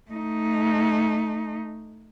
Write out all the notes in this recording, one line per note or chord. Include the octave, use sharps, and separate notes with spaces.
A3 D#4